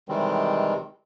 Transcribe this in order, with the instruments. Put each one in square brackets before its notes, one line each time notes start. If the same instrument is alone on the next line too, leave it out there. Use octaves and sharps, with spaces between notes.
[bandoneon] C3 D#3 E3 G3 G#3 C4